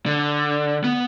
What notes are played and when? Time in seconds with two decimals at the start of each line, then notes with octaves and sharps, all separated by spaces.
0.06 D3
0.84 B3